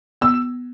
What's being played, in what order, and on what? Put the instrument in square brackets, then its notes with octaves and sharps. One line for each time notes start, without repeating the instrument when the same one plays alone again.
[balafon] B3 [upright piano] E6